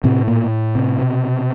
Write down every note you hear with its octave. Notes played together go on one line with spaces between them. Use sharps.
A2 C3 C4
A#2 A#3
C3 C4
B2